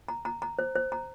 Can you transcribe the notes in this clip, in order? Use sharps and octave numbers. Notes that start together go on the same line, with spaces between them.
A#5
A#5
A#5
C5
C5
A#5